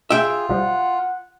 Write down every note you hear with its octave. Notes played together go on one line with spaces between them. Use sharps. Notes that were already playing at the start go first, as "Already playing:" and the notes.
F4 G#4 E5 G5
B1 F3 G3 F#5